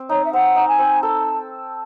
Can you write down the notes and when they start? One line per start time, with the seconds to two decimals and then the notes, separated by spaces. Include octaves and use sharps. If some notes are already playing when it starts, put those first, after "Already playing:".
Already playing: C4
0.09 D#4 C#5
0.25 E5
0.33 C4 F#5
0.56 D#4
0.68 G#5
0.79 C4
1.03 A4 A5